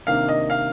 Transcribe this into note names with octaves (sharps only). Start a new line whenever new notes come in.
C3 D#3 A#3 D4 F5
D#5
F5